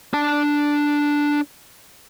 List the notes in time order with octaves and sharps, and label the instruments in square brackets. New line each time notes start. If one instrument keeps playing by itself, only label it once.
[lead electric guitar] D4 A5